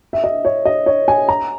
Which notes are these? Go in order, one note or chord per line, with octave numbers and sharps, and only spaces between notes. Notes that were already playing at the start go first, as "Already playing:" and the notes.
E5
D#5
C#5
D#5
C#5
G#5
A#5